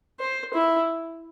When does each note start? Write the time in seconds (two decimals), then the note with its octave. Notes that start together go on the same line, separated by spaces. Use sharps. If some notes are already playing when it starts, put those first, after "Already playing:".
0.19 C5
0.54 E4